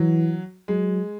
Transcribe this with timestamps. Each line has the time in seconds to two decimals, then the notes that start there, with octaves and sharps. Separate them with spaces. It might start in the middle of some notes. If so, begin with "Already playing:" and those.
Already playing: E3 F#3
0.68 F#3 G#3